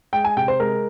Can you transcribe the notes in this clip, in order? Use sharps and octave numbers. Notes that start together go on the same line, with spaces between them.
G#3 G5
G#5
C3 G5
C5
G#3 A#4